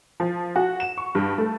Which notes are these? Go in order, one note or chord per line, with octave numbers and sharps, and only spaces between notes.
F3
F#4
E7
C#6
G2
A3